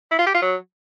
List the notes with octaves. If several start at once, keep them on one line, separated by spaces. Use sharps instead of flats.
E4
F4
G4
F4
F#3